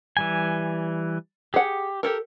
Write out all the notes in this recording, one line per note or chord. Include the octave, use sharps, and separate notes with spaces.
E3 G3 G#5
G4 G#4 F#5
G4 A4 A#4